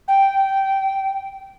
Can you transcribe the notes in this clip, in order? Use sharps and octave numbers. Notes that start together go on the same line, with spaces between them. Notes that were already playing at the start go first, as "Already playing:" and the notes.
G5